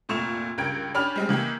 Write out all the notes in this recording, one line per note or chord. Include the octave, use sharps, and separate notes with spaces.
F1 A#2 A3 C#6 E7 F7
C#2 G2 A#4 G5 G#6 D7
C#4 D4 G4 B5 F6 F7
G3 G#3 C4
D#3 E3 A#3 G4